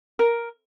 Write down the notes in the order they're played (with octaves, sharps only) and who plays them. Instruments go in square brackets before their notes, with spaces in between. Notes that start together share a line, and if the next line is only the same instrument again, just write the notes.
[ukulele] A#4